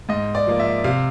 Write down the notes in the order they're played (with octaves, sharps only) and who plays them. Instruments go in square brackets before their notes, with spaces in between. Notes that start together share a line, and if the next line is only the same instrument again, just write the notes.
[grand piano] G#2 D#5
D5
F3 A#3
E5
C3 F5